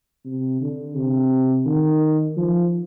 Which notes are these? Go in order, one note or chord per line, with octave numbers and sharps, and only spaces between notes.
C3
D3
C3
D#3
F3